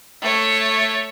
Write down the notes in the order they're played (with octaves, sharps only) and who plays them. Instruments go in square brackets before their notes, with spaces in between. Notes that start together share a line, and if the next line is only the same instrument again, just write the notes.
[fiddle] A3 C#5